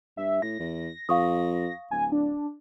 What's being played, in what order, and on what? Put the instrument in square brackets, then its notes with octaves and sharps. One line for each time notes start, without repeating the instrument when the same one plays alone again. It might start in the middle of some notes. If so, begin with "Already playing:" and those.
[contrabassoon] G2 [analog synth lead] E5
[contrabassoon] A2 [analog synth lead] A#6
[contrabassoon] E2
[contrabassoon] F2 [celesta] F5 C#6 D#6
[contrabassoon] D1 [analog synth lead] G#5
[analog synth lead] D4